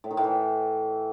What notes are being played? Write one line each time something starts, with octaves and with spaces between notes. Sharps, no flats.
A2
D#3
A2
E3